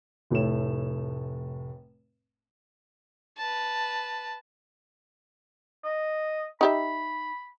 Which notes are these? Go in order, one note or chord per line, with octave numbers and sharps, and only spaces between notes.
F1 A2 A3 C#5 E7
B4 A5
D#5
D#4 G4 E5 B5